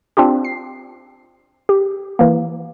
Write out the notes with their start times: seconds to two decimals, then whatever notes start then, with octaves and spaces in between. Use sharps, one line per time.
0.17 C4 D4 F4 G4
0.45 C7
1.69 G4
2.19 E3 A#3